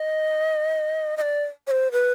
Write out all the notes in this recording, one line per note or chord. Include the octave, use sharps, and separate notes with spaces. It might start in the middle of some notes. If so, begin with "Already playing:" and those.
Already playing: D#5
D#5
D5
C#5
C5
B4